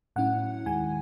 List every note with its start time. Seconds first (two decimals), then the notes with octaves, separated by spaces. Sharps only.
0.16 A2 F#3 C#4 E4 F#5
0.65 D#2 D#3 G#3 G#5